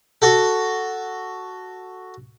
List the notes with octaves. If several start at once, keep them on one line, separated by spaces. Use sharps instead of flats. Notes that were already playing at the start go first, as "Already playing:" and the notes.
F#4 A4